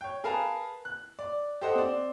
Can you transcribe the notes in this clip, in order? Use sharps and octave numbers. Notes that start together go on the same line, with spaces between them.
C#5 G5
G#4 A#4 B4 F5 A5 A#5
F#6
D5
G4 A4 C5 D#5 F#5
C4 D5